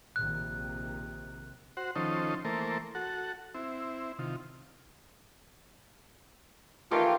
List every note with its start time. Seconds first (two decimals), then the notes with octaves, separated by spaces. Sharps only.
0.16 A#1 C3 D#3 F#6
1.77 F#4 C5 F#5
1.96 D#3 F3 C#4 D#4 A4 C5
2.45 E3 A3 A#3 A4 A#4 C5
2.95 F#4 A4 F#5
3.54 C4 E4
4.19 C3 D#3 F4
6.91 D#3 E3 A3 F4 G4